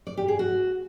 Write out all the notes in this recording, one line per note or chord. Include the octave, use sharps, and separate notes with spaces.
D5
G4
G#4
F#4